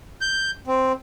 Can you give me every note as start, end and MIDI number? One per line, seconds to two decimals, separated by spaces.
0.21 0.51 91
0.67 0.92 60